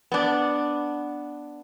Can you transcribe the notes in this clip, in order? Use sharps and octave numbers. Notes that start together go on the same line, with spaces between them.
B3 D4